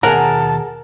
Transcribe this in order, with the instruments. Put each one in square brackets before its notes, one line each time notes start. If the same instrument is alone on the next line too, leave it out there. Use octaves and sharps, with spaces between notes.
[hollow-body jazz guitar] D#2 B2 A#5 [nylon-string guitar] G#4 F#5 [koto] A#4 [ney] A5